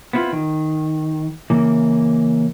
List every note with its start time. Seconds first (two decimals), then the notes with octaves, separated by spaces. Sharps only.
0.13 B3 C4 E4 F4
0.32 D#3
1.50 C#3 E3 A#3